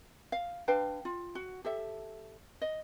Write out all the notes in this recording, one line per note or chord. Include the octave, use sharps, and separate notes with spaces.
F5
D4 B4 F5 G5
F4
F#4
G4 A4 E5
D#5